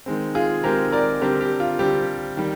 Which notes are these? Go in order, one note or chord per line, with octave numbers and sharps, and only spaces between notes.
D#3 G#3 C4
F4 G#4
D#3 G#3 C4 G4 A#4
A#4 D5
D3 G3 C4 G4 A#4
G4
F4
D3 G3 C4 G4
D#3 G3